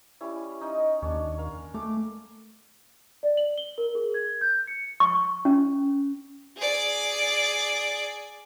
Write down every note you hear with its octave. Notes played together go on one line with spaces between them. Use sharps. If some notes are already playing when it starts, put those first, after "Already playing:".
G3 C#4 E4
C#4 D#4 D#5
D#2 C#4 D4
A#4 F5
A3 D6
D5
F#7
G7
A#4
G#4
G#6
G6
C#7
C#6
C#4
G#4 D5